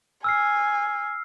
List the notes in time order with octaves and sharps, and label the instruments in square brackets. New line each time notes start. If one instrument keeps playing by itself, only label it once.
[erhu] G#5 [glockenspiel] E6 F6 C7